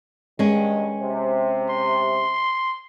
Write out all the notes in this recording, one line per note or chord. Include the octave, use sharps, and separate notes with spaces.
G2 D#3 G#3 C#4
C3
C6